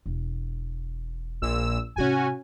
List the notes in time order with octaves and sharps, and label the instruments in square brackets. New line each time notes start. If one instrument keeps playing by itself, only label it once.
[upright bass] E1
[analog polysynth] A#1 A#2 E6
[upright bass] G#2 C3 [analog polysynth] C#4 F#4 G#5